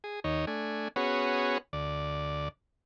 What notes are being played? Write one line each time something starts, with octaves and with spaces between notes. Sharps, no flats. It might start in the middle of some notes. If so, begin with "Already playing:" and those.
G#4
D#2 D#4 C#5
A3 D4 G#5
B3 C#4 F#4 G#4 B4 C#5
D2 D5